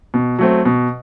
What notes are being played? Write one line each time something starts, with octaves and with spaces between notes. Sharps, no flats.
B2
F#3 A3 C4
B2